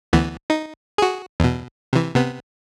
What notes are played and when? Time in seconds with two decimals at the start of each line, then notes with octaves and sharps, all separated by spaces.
0.13 D2 E3 B3
0.50 D#4
0.98 F#4 G#4
1.40 E2 B2
1.93 C3 E3
2.15 C3 B3